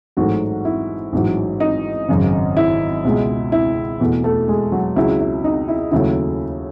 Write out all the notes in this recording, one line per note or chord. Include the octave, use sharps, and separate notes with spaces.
A1 G#2 F#3 A3 F#4
E4
A1 G#2 F#3
D#4
G#1 F#2 C#3
E4
C#2 B2 G#3
E4
E2 B2 A3
A3 A4
G#3 G#4
F#3 F#4
C#2 C#3 F#3 E4
E4
D#4
E4
D#2 C#3 F#3 A3 E4